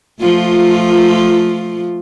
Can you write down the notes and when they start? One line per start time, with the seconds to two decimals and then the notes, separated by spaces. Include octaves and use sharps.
0.21 F3 A3 F4